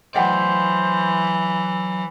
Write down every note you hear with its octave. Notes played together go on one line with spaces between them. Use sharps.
E3 F#3 C5 D5 D#5 F#5 G5